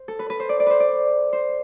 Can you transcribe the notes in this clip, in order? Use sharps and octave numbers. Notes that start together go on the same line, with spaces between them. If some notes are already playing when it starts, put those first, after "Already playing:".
Already playing: C5
A4
B4
B4
C5
D5
D5
B4 C5
D5
C5